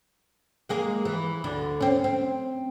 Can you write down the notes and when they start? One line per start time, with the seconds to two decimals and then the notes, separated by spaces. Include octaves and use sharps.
0.69 G#3 A#3 G#4
1.05 E3
1.44 D2 D3
1.81 C4 C#4
2.04 C4